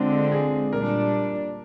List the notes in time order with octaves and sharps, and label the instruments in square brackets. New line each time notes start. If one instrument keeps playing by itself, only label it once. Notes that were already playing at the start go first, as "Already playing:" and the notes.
Already playing: [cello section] D3 G#3 C4 [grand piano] D4 F4
[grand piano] G#4
[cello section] A#2 G3 D4 [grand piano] A#4